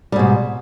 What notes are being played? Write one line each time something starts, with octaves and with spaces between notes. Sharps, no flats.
G#2 B2 G3